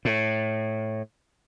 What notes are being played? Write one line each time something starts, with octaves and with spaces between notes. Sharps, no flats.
A2